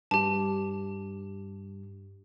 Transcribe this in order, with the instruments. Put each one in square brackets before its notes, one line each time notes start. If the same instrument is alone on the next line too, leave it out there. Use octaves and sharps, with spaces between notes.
[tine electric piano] G2 [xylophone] G4 A5